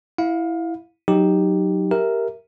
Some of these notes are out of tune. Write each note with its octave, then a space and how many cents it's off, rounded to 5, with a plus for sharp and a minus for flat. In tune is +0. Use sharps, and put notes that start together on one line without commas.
E4 +0 F5 +25
F#3 +0 D#4 +0 G4 +0
G4 +0 A#4 +0 E5 +0